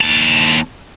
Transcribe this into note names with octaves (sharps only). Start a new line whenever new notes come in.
D#2 A5